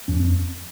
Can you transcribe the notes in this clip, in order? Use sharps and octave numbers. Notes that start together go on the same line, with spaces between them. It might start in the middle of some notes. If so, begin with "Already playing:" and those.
F2 C#4
C4